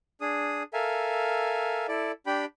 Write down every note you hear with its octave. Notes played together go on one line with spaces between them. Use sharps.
D4 G#4 D#6
A4 A#4 E5 F5 G#5
E4 A4 D5
D4 G4 G5 B5